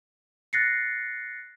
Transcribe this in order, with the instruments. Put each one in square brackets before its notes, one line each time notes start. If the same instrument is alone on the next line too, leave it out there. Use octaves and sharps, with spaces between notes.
[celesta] F#6 A6 A#6 C7 C#7